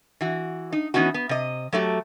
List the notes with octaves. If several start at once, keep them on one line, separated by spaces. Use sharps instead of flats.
E3 F#4
D#4
E3 B3 C#4 D#4 F#4
B3
C3 D#5
F#3 A3 F#4 G4